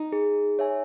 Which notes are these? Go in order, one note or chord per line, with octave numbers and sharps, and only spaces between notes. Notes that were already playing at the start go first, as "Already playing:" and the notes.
Already playing: D#4
G#4
C#5 E5 G#5